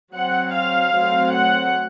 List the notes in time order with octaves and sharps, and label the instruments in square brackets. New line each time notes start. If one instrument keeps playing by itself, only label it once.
[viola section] F#3 C4 F#5
F5
F#3 A3 C4
F#5